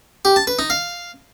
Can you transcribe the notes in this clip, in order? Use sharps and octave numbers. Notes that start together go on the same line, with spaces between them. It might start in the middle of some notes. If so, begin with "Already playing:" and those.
G4
A5
B4
D#4
F5